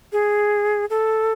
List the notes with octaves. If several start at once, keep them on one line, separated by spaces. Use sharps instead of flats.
G#4
A4